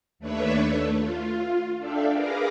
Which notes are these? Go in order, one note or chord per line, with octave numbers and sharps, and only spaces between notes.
D#2 A3 D4 B4 C#5 E5
A3
F4
D4 A4 D5 E5 F5 G5
G#4 A#4 B4 F5 A#5 D6